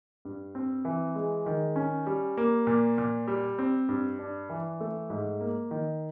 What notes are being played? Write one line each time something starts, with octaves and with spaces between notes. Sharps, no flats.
G2
C4
E3
G#3
D#3
C#4
G3
A#3
A#2
A#2
G3
C4
G2
D4
E3
A3
G#2
A#3
D#3